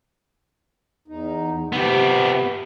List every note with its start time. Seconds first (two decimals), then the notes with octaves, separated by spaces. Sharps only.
1.08 E2 D#4
1.73 C3 B3 G4